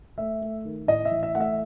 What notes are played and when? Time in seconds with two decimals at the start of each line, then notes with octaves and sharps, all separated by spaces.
0.18 A3 E5
0.41 A3
0.65 D#3
0.88 A2 D#5
1.05 E5
1.11 E3
1.23 E5
1.35 A3 F#5
1.40 E5